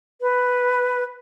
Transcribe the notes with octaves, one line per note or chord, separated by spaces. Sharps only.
B4